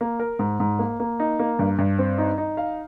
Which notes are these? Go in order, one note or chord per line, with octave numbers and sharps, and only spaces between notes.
A#3
A#4
G#2
G#2
A#3
A#3
D#4
A#3
G2
G2
C4
D#4
D#4
F5